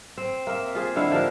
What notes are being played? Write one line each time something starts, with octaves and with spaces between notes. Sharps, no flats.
C4
A#3 A#4 E5
F4 G#4 C5
D3 G#3 E4 F5
F3 D4 G4 A#4